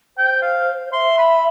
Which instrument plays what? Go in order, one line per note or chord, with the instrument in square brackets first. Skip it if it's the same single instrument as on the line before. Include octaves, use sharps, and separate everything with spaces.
[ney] C5 [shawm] G5
[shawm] F5
[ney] E5 [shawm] C6
[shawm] B5